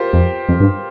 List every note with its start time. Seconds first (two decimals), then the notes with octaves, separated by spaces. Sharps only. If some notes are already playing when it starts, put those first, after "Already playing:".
Already playing: F4 G4 A#4 C5
0.13 F2
0.49 F2
0.60 G2